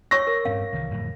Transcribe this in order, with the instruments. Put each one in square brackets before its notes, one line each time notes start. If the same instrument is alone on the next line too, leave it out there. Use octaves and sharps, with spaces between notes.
[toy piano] C#5 C#6 E6 [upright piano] A#6
[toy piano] A#4
[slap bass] G2 C4 C#4 [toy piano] F5
[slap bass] C2 D#3 E3
F2 A2 D3